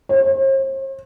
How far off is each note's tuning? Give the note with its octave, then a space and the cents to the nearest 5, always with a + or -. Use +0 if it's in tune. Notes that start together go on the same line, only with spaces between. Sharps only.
C5 +45